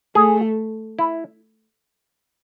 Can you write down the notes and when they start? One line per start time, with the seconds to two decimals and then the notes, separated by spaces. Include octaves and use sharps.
0.15 A3 G#4
0.99 E4